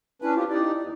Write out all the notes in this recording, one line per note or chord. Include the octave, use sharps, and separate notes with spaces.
C#4 D4 E4 B4
C4 F4 G4
D#4 E4 G4 D5
E2